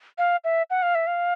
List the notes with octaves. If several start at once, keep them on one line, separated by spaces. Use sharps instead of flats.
F5
E5
F#5
F5
E5
F5